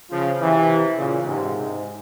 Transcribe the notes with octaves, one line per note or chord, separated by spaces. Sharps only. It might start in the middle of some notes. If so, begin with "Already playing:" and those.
C#3 F3
C3 E3
A#2 C#3
G#2 C3